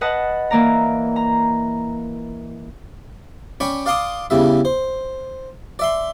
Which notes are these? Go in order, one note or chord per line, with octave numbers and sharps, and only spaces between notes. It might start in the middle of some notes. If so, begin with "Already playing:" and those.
B4 D#5 F#5 A5
E3 A#3 D5 A#5
A#5
C#4 D5 G5 B5 C#6
D5 F5 A5 C6 D6 D#6
E2 C#3 G3 E5
C5
D5 E5 C6